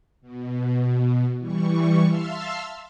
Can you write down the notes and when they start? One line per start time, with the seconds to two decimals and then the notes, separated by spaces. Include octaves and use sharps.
0.21 B2
1.38 E3 G3 C#6
2.06 E5 F5 A5 C6 E6 F6